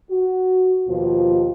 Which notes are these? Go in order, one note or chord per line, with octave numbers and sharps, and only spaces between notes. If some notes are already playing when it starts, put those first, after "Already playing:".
F#4
D#2 B2 F3 F4